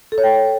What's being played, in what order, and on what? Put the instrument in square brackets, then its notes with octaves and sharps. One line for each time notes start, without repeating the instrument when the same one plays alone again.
[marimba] A4
C#5
G5